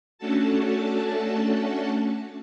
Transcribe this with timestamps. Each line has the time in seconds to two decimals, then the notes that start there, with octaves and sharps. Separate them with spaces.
0.18 A3 C#4 D4 F#4 A4 A5